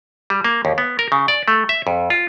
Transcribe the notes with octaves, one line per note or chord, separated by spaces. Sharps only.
G3
A#3
D#2
B3
A#4
C#3
D5
A3
E5
F2
F4